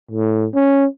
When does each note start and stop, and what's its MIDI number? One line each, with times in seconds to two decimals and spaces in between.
0.11 0.47 45
0.54 0.86 61